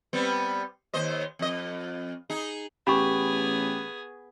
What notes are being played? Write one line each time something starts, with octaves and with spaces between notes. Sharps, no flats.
G3 B3 C4
D#2 C5 D#5
F2 D#5
D#4 G#4
A1 B3 G4 G#4 B5 C#6